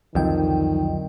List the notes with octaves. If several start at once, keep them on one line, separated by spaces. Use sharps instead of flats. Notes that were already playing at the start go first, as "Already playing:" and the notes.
C2 F2 D3 D#3 F#3 G5